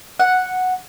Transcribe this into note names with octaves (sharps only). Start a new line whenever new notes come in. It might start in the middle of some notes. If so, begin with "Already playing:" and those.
F#5